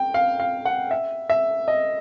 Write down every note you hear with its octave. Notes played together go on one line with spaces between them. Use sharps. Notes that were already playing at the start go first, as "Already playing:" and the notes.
Already playing: G5
F5
F5
F#5
E5
E5
D#5